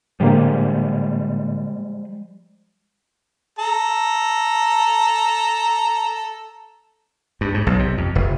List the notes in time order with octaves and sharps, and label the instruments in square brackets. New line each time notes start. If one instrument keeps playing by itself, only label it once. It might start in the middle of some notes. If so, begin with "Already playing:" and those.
[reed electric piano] A2 D3 A#3 [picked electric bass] F3 G3 G#3
[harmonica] A4 A#5
[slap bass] G2
G#2
B1
C3
F2
F1